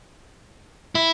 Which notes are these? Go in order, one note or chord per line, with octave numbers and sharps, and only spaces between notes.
E4